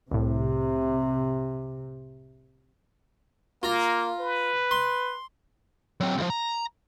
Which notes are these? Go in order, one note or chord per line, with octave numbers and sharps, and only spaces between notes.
C2 A2 C3
A#3 F4 A#5
B4
C6
F#3 C4
C#2 F3
A#5